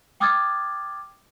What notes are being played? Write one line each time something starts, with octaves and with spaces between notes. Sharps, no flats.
G5 D6 D#6 F6 G#6 A6